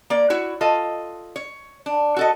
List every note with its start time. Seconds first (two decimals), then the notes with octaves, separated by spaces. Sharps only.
0.10 A#3 D5
0.30 E4 F#4 C#5
0.61 F4 A4 D#5
1.36 C#5
1.86 D4
2.16 F#4 A4 D#5